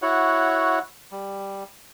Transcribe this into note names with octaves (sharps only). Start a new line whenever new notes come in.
E4 F#4 C#5 F#5
G3